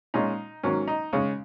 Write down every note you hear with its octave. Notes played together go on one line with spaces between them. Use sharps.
A#2 G#3 C#4 D#4
G#2 D#3 F#3 A#3 C#4
D#4
C#3 G#3 C#4